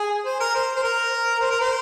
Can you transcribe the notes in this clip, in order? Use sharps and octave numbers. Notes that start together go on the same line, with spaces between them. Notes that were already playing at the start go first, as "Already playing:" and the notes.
Already playing: G#4
C5
A#4
C5
C5
A#4
C5
A#4
C5